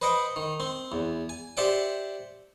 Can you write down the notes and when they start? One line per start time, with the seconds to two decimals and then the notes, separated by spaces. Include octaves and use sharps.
0.02 B4 C5 D#5 F#5 G5
0.36 D#3
0.60 C4
0.92 E2
1.29 G#5
1.57 G4 C5 D5 E5 F#5 G5